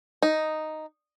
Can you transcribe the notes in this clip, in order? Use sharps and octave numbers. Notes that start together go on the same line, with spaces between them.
D#4